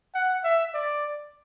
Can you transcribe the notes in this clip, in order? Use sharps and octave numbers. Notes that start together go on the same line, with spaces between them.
F#5
E5
D5